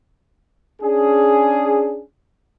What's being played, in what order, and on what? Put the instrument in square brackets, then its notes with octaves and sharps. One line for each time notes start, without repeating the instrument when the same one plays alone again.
[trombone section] C#4 D4 G#4